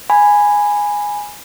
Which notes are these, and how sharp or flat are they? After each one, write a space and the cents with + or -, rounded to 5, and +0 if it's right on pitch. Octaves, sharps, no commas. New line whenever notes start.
G#5 -5 B5 +0